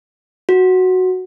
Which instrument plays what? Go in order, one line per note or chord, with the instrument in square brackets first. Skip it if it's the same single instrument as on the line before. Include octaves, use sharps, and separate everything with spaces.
[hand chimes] F#4